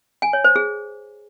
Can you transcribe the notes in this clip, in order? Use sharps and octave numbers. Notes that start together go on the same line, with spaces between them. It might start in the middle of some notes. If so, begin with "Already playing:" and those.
G#5
C#5
C5
G#4